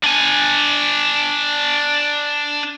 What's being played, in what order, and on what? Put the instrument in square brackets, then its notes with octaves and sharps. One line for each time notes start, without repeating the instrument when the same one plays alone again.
[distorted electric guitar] D4 G#5